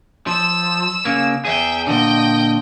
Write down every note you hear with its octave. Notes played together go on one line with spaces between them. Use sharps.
F3 E6 E7
C#3 A#3
E2 G#4 E5 G5
A#2 D3 D#5 G5